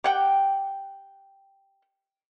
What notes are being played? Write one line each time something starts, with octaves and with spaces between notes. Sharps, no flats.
G4 F#5 G5